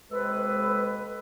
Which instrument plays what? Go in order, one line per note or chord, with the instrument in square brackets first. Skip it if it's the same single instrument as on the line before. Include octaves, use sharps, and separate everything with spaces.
[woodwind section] D#2 C3 G#3 A4 B4